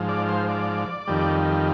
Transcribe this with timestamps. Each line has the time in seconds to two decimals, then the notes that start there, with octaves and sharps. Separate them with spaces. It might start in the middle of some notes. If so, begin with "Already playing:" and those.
Already playing: G#2 F3
0.09 D5
0.29 C5
0.49 D5
1.08 F2 D#3 G3